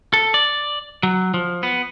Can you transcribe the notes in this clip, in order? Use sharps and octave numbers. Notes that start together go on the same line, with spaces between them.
A4
D5
F#3
F3
B3